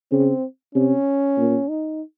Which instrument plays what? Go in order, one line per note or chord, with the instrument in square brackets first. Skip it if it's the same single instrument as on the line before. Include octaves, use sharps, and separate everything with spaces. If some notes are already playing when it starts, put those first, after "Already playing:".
[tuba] C#3 [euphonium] C4
[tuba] C3 [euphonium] C#4
[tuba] A#2
[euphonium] D#4